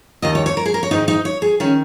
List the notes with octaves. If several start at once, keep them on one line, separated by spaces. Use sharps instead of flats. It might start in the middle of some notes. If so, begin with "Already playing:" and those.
D#2 D#3 D#5
C#5
C#5
A#4
G#4
A#4
C#5
G#2 D#3 D#4
D#4
C#5
G#4
D#3 C#4